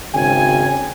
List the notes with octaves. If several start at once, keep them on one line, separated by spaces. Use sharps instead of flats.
G#1 C#3 G5 G#5